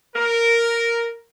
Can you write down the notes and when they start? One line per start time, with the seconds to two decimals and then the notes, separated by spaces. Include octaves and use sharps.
0.16 A#4